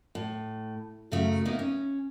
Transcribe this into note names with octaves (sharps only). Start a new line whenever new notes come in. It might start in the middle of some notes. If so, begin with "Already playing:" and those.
A2
F#2 C#3 F#3 A3
A#3 B3 D#4 E4 A#4
C#4